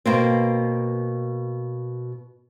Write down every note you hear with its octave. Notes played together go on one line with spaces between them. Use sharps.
B2 A#3 C4